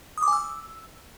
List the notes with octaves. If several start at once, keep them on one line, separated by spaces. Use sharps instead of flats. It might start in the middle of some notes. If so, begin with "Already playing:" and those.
D#6
D6
G#5
E6